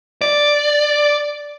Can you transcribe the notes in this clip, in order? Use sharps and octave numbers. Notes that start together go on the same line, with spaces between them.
D5